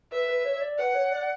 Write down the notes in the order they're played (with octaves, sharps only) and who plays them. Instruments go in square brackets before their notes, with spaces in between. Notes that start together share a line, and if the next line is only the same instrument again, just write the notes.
[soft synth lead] B4 [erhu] E5
[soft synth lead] B4
C#5
C#5
D5
[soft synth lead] B4 [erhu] F#5
[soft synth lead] C#5
D5